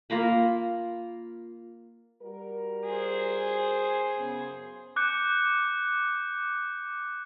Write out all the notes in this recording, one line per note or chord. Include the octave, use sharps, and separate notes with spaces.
A#3 F4 A#5 B5
G3 F#4 A#4
G#4 C5
F#2 C#3 B3
D6 F#6 G6 C#7